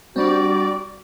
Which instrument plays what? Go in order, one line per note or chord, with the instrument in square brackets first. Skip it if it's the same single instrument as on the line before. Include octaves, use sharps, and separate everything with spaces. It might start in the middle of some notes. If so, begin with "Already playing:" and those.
[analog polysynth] G3 D5 [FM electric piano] C4 D4 [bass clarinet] F#4